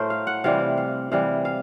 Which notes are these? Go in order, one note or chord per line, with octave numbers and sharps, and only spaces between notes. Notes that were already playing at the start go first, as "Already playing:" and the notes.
Already playing: A2 A3 A#4 C5
F5
F#5
C3 E3 G3 F5
F5
C3 E3 G3 F5
F5